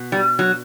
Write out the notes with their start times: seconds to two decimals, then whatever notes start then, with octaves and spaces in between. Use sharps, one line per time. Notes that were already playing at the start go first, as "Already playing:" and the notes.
Already playing: B2
0.12 G3
0.39 F#3